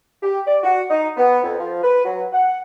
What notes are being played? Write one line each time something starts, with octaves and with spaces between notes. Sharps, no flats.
G4
D5
F#4
D#4
B3
F2
F3
B4
F#3
F#5